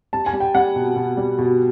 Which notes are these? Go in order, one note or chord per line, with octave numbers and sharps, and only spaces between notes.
G3 A5
G#5
G3
G5
G3 F#5
B2
B2
G3
B2